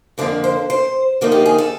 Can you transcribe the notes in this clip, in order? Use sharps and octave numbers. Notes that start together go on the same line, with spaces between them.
F2 D3 F3 A#3 D5
C5
C5
D3 F3 A#3 D#4
G4
G#4
A4